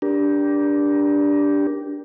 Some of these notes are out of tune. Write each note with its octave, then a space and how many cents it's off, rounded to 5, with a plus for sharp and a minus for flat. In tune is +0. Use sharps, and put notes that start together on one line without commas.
D4 -10 G4 +0 A#4 +20